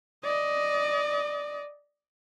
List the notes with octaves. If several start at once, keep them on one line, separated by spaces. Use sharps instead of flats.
D5 D#5